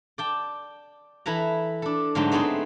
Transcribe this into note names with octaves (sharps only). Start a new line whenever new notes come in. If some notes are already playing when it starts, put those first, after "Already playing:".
D5 G5 A5
E3 E4 A4 B4 A5 A#5
D4 A4
G#2 D3 F#3 A3 G5 A5
A3 B3 C4 D#4 G#4 A4